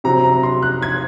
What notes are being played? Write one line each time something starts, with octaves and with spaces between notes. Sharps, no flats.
C3 F#3 C4 A#5
A#5
C6
F#6
G#6